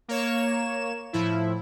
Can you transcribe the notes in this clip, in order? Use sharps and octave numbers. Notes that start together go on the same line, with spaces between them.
A#3 C#5 E7
A2 F3 E4